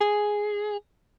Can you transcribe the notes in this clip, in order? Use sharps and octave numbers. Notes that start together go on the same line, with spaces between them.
G#4